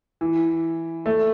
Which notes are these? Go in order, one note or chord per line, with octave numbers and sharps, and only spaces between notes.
E3
A3